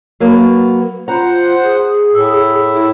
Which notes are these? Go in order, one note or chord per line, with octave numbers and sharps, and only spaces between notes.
F#3 A#3 B3
F4 C5 F#5 A#5
G#4
A2 E5
E4